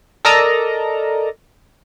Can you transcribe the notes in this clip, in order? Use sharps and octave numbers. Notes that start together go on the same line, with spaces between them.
A4 A#4 D5 D#5 A5 A#5